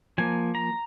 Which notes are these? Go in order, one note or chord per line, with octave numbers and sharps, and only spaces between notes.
F3 A#3 G#5
A#5